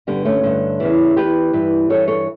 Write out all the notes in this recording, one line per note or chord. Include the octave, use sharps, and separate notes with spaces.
G2 D3 G3 B3
A3 C#4
G2 D3
E2 C#3 E3
E2 C#3 E3 G4 B4
G2 E3
G2 E3 A4 C#5
A4 C#5